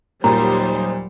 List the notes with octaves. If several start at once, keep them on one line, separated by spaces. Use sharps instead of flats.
D#2 A#2 F#3 G3 D#4 C5 A#5